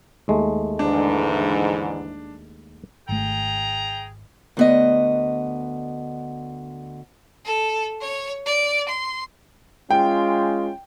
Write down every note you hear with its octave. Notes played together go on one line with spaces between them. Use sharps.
D#2 G#3 A3
G#2 D3 E3 D4
G#1 A3 G#4 G5 A#5
D2 B3 D#5
A4
C#5
D5
C6
G#3 C#4 F4 G5